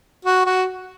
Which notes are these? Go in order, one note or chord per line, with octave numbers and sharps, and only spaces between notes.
F#4
F#4